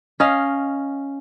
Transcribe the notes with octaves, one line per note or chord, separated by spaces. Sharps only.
C#4 D#5 F5